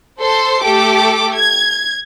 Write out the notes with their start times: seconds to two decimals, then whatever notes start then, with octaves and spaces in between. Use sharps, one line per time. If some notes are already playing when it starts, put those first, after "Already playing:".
0.20 A4 C5 C6
0.63 A3 G4 A4 D6
1.36 G#6